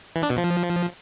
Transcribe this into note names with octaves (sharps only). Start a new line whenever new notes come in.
E3
D4
B2
F3